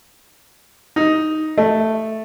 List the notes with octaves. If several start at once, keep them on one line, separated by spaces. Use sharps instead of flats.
D#4
A3